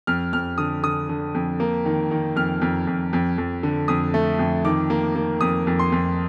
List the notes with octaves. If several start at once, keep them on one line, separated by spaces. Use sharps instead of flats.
F2 F6
F2 F6
D3 D#6
D3 D#6
D3
F2
A#3
D#3
D#3
F2 F6
F2
F2
F2
F2
D3
F2 D#6
A3
F2
D#3 D6
A#3
A#3
F2 D#6
F2
C6
F2